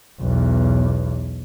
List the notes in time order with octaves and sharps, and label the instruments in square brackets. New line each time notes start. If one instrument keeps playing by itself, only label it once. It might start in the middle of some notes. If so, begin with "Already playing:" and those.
[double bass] B1 E2